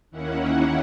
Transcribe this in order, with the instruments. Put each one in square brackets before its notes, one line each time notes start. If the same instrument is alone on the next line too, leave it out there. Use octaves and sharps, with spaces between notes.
[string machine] D#2 D#3 A#3 C#4 E4 F#5